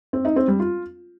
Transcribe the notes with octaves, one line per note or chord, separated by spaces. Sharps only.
C4
D#4
C4
G3
F4